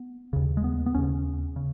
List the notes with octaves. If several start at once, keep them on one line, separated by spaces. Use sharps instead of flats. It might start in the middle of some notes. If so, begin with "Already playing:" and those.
Already playing: B3
D#2 C#3
G#3
B3
B3
D#2 C#3 C#4
C#3